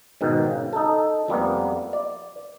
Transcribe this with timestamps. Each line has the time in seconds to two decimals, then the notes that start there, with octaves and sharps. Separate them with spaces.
0.21 G#2 B2 D#3
0.47 C#3
0.73 D#4 A4
1.28 F2 G3 A#3 B3
1.93 D5